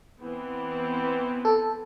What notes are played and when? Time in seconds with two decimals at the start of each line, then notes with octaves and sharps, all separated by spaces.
0.20 E3 B3 C4
1.45 A4